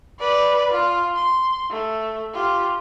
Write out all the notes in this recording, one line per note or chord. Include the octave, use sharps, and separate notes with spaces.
B4 D5
F4
C6
A3
F4 G4